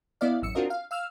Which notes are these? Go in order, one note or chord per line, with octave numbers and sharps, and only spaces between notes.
B3 E4 D5 D#5 F5
A1 F#2 E6 C#7
C4 D4 F4 F#4 A#4 D#5
F5
F5 E6 F6